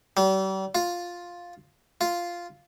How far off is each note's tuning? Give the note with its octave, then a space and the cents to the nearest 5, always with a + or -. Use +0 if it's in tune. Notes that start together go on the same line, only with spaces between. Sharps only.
G3 -40
F4 +5
F4 -5